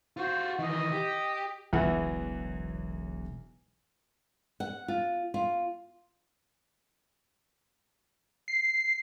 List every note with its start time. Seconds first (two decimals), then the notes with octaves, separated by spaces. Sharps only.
0.17 F4 F#4 C5
0.59 D#3 E3 D#5
0.92 G4
1.73 E1 B1 E2 C#3 E3 F#5
4.60 F#5
4.88 F4
5.34 F4
8.48 C7